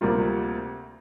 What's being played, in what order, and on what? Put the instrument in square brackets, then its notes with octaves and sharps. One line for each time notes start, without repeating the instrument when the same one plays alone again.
[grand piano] D2 C3 G3 A#3 F4